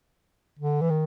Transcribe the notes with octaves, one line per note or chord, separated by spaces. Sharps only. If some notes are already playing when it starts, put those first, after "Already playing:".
D3
E3
D#3